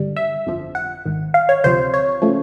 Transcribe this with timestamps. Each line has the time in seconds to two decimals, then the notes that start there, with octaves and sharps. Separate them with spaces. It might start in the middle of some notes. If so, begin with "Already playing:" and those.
Already playing: G2 D3 G3
0.16 E5
0.47 G1 F2 D3 F3
0.75 F#5
1.06 G#1 G#2 D#3
1.34 F5
1.49 C#5
1.64 D2 C3 F3 C5
1.94 C#5
2.22 C#3 F3 A3